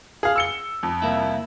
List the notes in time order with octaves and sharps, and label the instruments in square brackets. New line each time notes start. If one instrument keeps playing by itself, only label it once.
[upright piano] G#4 F5
E6 C#7 G7
F2
[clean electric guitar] C2 A#3 E4